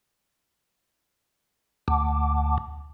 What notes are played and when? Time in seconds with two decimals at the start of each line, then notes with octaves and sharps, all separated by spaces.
1.88 D2